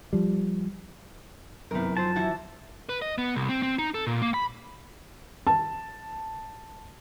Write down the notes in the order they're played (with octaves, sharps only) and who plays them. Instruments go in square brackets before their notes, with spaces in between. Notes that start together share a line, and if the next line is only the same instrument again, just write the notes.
[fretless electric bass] F3 G3
[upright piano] G1 C2 [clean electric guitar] F#2 D#3 [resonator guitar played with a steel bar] A#4 B4
[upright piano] F3 [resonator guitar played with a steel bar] F#3 C5 [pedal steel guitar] A5
[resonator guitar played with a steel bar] E3 E4 F#4
[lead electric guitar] B4
D#5
B3
C2
C4
C4
D#4
A4
A#2
A#3
B5
[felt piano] A5